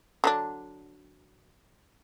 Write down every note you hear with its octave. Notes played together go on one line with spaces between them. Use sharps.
D3 F#3 D4